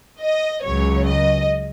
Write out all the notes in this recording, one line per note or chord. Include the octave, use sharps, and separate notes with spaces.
D#5
C#2 C#3 F#3 C#5
D#5